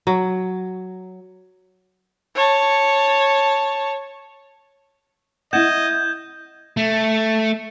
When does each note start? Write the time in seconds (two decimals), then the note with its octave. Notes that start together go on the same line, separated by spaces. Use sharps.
0.07 F#3
2.35 C#5 A5
5.53 E4 D#5 F#5 G6 G#6 E7
6.77 A3